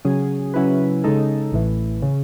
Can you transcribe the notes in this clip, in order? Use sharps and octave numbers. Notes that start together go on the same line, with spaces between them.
C#3 F#3 C#4 G#4
C#3 F#3 C#4 E4 B4
C#3 G#3 D#4 A4
A1 A2 E3
C#3